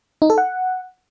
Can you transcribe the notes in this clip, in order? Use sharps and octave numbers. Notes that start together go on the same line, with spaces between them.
D#4
A4
F#5